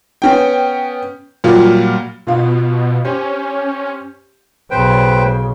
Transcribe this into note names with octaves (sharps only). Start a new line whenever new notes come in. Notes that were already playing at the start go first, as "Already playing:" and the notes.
B3 C#4 G5
A#2 F#3 G3 F4
B2 F4 F5
C#4 G4 C5
B1 C#3 B4 C5 G5